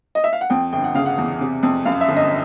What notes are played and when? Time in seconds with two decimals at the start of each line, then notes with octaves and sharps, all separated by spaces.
0.15 D#5
0.24 E5
0.33 F5
0.41 F#5
0.50 F2 G5
0.73 G1 G5
0.84 F#5
0.95 C#3 F5
1.06 F#5
1.18 E2
1.41 C3
1.63 F2
1.85 F#2 F5
2.01 E5
2.08 G1
2.16 D#5